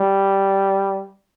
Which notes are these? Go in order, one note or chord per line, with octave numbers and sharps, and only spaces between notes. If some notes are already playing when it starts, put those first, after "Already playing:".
Already playing: G3